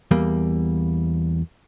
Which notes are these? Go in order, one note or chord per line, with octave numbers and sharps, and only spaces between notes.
E2 G3 A#3